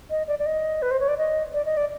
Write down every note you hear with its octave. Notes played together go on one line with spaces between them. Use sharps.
D#5
D5
D5
D#5
B4
C5
C#5
D5
D#5
D5
D#5
D5